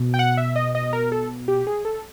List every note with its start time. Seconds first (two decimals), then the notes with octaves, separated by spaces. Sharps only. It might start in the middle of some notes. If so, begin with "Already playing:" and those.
Already playing: B2
0.14 G5
0.19 F#5
0.37 E5
0.56 D#5
0.75 D#5
0.93 A#4
1.12 A4
1.48 G4
1.67 G#4
1.85 A4